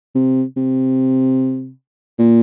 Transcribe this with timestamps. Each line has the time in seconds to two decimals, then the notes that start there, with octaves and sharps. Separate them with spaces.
0.15 C3
0.57 C3
2.19 A#2